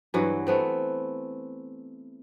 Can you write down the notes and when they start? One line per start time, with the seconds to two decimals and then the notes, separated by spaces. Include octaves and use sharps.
0.14 G2 E3 F#3
0.47 A3 B3 C4